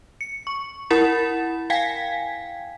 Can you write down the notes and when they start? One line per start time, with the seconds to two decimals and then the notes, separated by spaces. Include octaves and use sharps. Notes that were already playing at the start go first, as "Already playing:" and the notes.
0.21 C#7
0.47 C#6
0.90 E4 A#4 F#5 B5 A6 E7
1.70 F5 G5 G#5 G#6 B6